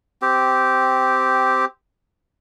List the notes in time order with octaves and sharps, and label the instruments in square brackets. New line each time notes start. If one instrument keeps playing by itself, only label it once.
[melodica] C4 G4